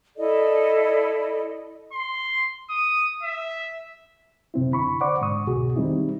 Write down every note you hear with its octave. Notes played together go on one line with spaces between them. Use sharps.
E4 A4 D5 D#5
C6
D#6
E5
F#2 C3 C4 E4
D3 B5 C#6
C5 D5 F#5 C#6 D6
G#2 D3 C#6 D#6
C2 F2 B2 F#4 G#4
D#3 G3 C4 D#4 E4